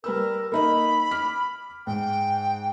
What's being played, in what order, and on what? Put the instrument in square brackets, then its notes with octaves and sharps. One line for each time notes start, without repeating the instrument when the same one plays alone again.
[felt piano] G3 B4 E6 [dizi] A#4
[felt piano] A#3 D#4 D#5 [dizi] B5
[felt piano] D6 F6 B6
[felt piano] G#2 [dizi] G5